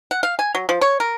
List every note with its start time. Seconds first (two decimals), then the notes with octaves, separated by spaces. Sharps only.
0.11 F#5
0.23 F5
0.39 G#5
0.55 F#3
0.69 F3
0.81 C#5
1.00 A#4